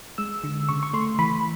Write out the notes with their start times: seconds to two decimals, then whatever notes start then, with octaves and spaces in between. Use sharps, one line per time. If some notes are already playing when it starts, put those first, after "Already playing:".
0.18 G#3 E6
0.44 D3
0.69 C#3 C#6
0.83 C#6
0.93 A3 C6
1.19 E3 B5